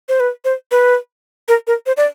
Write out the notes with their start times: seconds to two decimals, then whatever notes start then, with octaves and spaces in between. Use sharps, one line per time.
0.09 C5
0.20 B4
0.45 C5
0.71 B4
1.48 A#4
1.67 A#4
1.86 C5
1.97 D5